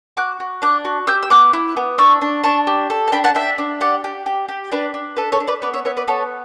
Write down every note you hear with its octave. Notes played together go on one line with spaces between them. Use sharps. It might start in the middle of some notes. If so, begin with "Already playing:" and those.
F#4 D6 F#6
F#4
D4 D6 F#6
F#4
G4 E6 G6
E6
B3 D6 F#6
E4
B3
D4 C#6 E6
D4
D4 A5 C#6
G4
A4
A5
D4 G5 B5
F#5 A5
D4 E5 G5
D4
G4 D5 F#5
G4
G4
G4
D4 B4 D5
D4
A4 B4
A4 C#5
D4
B4 D5
B3 B4 D5
C#5 E5
B3 C#5 E5
B4 D5
B3 A4 C#5